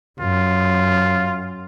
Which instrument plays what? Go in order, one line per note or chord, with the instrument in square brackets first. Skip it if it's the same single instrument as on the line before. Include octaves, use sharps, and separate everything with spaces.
[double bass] F#2 [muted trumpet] F4